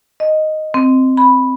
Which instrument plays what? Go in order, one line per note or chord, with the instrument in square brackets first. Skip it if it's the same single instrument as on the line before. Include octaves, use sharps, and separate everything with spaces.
[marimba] D#5
C4
B5